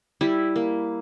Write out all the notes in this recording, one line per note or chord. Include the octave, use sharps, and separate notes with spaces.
G3 E4
A#3